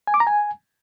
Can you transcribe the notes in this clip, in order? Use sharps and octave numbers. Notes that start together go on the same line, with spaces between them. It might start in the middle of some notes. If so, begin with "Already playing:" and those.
G#5
D6
A#5
G#5